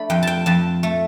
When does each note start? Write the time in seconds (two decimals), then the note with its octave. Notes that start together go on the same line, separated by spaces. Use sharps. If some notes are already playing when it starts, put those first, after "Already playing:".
Already playing: A3 D4 B5
0.10 F2 G5
0.23 G5 A5
0.46 F2 A5
0.83 A3